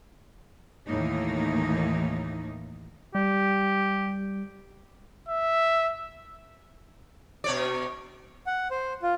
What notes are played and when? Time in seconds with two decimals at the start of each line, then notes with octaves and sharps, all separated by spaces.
0.86 D#2 A2 E3 A#3 D#4
3.15 G3 G4
5.28 E5
7.44 B2 C#5 D5
8.47 F#5
8.71 C5
9.02 F4